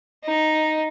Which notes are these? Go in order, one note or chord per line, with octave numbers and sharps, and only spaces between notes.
D#4